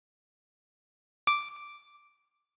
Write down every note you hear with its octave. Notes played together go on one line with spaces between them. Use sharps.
D6